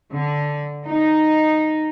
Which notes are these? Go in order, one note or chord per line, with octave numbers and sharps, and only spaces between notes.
D3
D#4